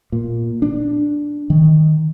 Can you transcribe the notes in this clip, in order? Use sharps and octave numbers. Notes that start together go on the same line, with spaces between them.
A#2
D4
D#3